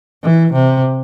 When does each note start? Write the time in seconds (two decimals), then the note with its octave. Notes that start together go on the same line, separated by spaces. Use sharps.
0.24 E3
0.53 C3